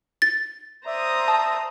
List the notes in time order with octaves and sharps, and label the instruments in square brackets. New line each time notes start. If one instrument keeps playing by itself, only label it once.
[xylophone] A6
[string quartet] C5 A#5 D#6 [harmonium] D5 E5
[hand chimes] A5